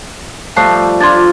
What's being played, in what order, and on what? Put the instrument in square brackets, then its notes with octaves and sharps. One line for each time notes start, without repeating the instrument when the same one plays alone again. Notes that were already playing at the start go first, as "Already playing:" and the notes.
[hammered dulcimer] F3 G3 A3 [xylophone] A5 F#6 C7
[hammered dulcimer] D4 F4 [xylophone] C6 G#6 A6